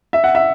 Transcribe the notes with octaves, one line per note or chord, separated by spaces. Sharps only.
E5
F#5
E5